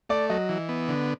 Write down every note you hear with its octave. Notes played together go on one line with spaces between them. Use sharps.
A3 D5
F#3 D#5
E3
B3
D3